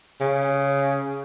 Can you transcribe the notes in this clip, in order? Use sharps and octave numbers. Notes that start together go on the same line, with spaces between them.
C#3